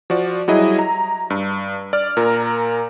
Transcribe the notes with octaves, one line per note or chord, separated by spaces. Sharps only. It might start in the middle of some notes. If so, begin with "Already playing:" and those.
F3 F#4 D5
F#3 G3 E4 G#4 D#5
A#5
G2
D5 F6
A#2 A#4 A#5